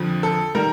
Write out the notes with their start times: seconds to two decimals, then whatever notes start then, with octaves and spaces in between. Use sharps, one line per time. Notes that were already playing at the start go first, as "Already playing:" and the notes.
Already playing: F2 D3 F3
0.23 A4
0.55 D#3 G3 A#4